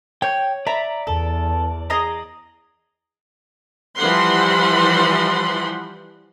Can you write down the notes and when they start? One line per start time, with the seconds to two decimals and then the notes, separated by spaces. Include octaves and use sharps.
0.22 C#5 G5 G6
0.67 D5 E5 A#5 B5
1.07 E2 A4
1.90 G#4 D#5 A#5
3.97 E3 F3 G3 F#5 B5 C6